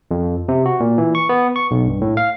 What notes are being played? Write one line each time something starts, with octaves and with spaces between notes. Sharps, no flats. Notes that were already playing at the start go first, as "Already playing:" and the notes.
F2
C3
F#4
A#2
E3
C#6
B3
C#6
B1
G2
A2
F5